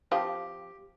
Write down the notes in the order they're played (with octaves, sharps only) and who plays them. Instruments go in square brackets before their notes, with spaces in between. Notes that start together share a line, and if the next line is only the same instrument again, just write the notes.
[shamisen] F3 C4 F4 [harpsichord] G4